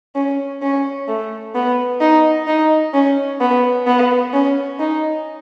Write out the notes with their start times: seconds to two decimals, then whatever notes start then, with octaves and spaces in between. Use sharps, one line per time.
0.15 C#4
0.62 C#4
1.08 A3
1.55 B3
2.01 D#4
2.47 D#4
2.94 C#4
3.41 B3
3.87 B3
4.34 C#4
4.80 D#4